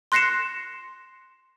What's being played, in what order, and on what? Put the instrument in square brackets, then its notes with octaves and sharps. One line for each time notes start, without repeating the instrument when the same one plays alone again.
[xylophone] C6 F#6 A#6 C7 C#7 E7